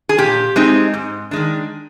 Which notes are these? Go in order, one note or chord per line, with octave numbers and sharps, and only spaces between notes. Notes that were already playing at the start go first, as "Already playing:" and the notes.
G#4
A#2 G4
G#3 C4 D#4
G#2
D#3 G#3 D4